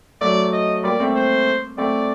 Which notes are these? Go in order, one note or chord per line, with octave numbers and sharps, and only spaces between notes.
F#3 A3 D5
D#5
G3 A#3 D5
A3 C4
C5
A3 C4 D5